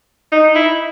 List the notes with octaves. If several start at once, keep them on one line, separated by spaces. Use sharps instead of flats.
D#4
E4